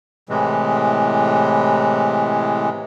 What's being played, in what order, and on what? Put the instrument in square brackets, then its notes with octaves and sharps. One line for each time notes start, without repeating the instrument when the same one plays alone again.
[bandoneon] A2 C3 E3 G#3